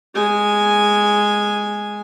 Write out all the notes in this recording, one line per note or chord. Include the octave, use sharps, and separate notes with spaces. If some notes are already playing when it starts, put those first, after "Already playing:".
G#3 G#5